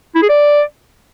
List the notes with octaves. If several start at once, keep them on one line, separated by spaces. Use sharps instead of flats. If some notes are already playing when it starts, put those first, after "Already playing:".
E4
G#4
D5